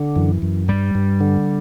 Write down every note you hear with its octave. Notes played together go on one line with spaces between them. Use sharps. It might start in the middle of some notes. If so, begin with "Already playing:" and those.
Already playing: D3
F#2 E3
F#2
G2 G3
G2
D3